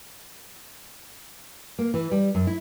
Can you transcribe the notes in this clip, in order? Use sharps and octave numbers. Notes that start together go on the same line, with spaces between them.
A#3
E3
G3
F#2
E4